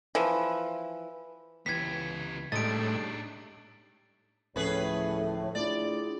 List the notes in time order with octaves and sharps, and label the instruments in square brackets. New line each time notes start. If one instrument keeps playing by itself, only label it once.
[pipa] E3 F3
[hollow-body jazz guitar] C#2 E3 [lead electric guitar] B3 G4 [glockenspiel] G#6 B6
[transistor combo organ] A2 [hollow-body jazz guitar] G3 G#3 D#5 [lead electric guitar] D4 D#4 [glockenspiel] A6 D7
[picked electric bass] D1 F3 [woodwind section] A2 [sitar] C#4 G#4 B4
[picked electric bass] A3 D4 [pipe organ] E4 F4 G#4 [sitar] D5